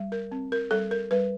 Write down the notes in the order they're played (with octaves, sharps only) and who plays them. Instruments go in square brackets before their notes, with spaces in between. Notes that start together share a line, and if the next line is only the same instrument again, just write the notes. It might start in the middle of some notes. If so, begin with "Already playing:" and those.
Already playing: [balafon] G3
A#4
C4
A#4
G3 A4
A#4
G3 B4